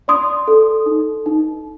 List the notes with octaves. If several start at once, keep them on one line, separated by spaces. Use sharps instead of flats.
D5 C6 D#6
A4
D#4
D#4